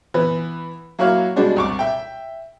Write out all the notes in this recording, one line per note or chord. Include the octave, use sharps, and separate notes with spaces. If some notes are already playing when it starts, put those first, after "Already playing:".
E3 B3
F#3 A#3 E4 F#4 C#5 F5
B2 G3 G#3 D4 F#4
C2 C#6 D6
E5 G5